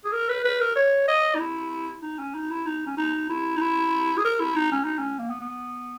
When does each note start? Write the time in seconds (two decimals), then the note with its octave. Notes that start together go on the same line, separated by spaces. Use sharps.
0.05 G#4
0.13 A#4
0.29 B4
0.44 B4
0.60 A#4
0.76 C#5
1.08 D#5
1.35 D#4
1.39 E4
2.03 D#4
2.19 C#4
2.34 D#4
2.50 E4
2.66 D#4
2.86 C#4
2.97 D#4
3.29 E4
3.56 D#4
3.61 E4
4.17 G#4
4.24 A#4
4.40 E4
4.56 D#4
4.72 C#4
4.85 D#4
4.99 C#4
5.19 A#3
5.30 B3
5.40 B3